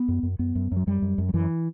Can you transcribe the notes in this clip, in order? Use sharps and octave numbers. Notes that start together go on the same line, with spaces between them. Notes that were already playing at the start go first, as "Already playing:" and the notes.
Already playing: B3
F#2
F#2
F#2 B3
F#2
F#2 F#3
F#2 G3
F#2
F#2
F#3
F#2 E3